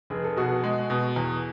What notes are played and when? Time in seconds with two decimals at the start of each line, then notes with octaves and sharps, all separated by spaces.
0.10 F1 G#4
0.24 A4
0.36 B2 F#4 G#4
0.64 G#3
0.90 B2
1.16 E2